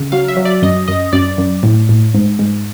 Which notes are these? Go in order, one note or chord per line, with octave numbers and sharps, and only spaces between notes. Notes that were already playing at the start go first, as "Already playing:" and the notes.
Already playing: C#3
F#3 F5
E5
F#3
D5
F#2 D#5
F#2 D#5
F#2 D5
F#2
A2
A2
G#2
G#2